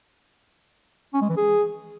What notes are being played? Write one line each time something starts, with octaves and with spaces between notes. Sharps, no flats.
C#4
G#3
E3
G#4